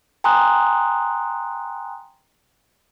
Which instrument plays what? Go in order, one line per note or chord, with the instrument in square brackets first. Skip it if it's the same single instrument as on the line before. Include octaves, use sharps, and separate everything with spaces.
[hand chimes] G5 G#5 A#5 C6 D#6 F#6